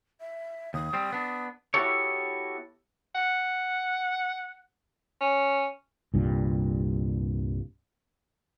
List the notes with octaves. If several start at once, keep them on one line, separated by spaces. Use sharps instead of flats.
E5
D#2 D#6
G3 C4
B3 D4
B3 E4 F#4 G4 A4 C#5
F#5
C#4
C2 G2 A#2